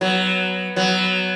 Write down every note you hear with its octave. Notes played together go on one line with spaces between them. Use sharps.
F#3 B3
F#3 B3